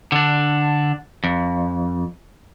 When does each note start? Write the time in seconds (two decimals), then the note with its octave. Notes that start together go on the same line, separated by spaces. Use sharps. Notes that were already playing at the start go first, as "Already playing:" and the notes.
0.12 D3 D4
1.24 F2